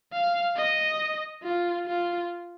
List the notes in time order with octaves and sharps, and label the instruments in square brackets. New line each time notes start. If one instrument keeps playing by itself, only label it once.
[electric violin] F5
D#5
F4
F4